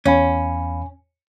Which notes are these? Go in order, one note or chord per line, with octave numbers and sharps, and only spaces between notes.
E2 C#4 F5 B5